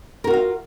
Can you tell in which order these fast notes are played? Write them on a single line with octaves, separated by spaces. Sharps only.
A#4 F#4 F4 F5